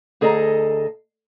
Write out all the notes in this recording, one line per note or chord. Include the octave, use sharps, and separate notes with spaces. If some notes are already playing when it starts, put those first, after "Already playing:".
D2 G#4 A4 D#5 F5 A#5